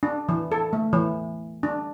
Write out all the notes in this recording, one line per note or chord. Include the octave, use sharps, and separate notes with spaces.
D4
E3
A4
A3
E3
D4